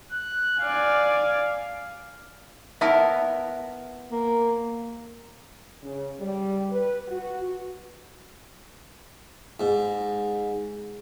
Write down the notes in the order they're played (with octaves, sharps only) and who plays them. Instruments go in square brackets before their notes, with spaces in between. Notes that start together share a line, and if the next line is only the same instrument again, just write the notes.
[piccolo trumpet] F#6
[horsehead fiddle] D5 G#5 [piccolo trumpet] F5
[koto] B3 E4 A#4 [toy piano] E5 A5
[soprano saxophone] A#3
[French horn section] C#3
G3
B4
F#4
[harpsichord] G#2